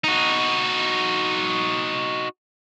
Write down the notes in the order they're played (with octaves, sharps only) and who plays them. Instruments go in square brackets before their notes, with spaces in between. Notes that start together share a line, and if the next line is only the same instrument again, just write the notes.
[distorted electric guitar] D#4 F#4